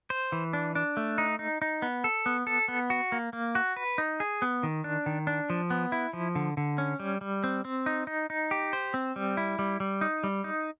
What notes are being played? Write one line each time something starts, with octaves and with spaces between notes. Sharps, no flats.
C5
E3
D4
D4
A3
D#4
D#4
D#4
B3
A4
B3
A4
B3
F#4
A#3
A#3
F#4
B4
D#4
G#4
B3
D#3
D4
D#3
D4
F3
B3
E4
F3
D3
D3
C#4
G3
G3
C4
C4
D#4
D#4
D#4
G4
C5
C4
G3
E4
G3
G3
D#4
G3
D#4